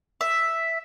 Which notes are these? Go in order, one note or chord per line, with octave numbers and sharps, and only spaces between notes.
E5